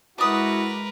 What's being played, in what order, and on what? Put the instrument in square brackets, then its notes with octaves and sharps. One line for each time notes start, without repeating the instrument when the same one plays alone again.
[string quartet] G#3 [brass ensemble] E4 F#4 [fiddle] A#4 B4 [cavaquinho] D5 D#6